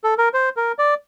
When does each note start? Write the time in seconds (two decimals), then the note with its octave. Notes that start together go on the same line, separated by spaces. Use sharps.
0.04 A4
0.18 A#4
0.34 C5
0.57 A#4
0.79 D5